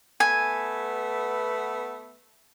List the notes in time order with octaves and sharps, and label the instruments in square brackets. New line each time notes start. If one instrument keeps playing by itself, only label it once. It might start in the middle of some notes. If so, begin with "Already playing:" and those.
[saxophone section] A3 B3 [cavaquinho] G#5